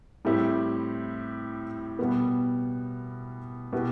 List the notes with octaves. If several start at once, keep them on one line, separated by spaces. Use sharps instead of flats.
A2 G3 C4 E4 G4
B2 G3 B3
B2 B3 E4 G4